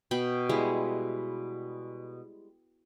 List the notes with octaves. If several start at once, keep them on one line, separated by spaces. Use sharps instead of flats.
B2 G5 B5
G3 G#3 E4